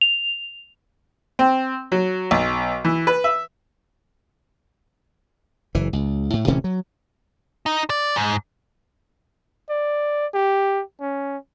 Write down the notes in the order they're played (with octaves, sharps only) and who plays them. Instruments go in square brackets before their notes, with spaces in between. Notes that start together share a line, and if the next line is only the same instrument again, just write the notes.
[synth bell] F7
[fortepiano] C4
F#3
B1
E3
B4
E5
[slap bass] F#1 E3
C#2
A2
D1 C3 E3 C#4
F#3
[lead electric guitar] D#4
D5
G#2
[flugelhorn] D5
G4
C#4